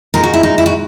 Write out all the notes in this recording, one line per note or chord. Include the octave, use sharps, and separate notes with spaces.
A#2 G#3 D#4 A#4
F#4
E4
D#4
E4
F#4